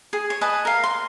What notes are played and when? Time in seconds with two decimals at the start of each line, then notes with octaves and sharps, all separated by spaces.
0.13 G#4
0.30 C#5
0.41 B4 D#5 G#5 A5
0.65 A#4 F5
0.84 C6